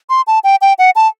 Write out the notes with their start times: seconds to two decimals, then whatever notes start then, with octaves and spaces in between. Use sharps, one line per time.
0.10 C6
0.27 A5
0.44 G5
0.62 G5
0.79 F#5
0.96 A5